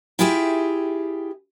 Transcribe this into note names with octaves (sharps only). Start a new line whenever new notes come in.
E4 F4 G4 G#4 E5 G5